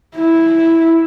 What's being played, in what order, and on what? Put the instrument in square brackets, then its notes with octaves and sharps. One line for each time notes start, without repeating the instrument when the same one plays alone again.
[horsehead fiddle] E4